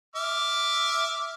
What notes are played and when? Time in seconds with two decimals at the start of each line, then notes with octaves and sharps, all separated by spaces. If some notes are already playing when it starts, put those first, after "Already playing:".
0.16 E5 D6 F6